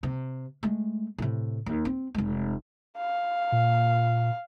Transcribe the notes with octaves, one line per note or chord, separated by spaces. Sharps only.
C3
G#3 A3
A2 C3
D#2
C4
F1 G#3
F5
A#2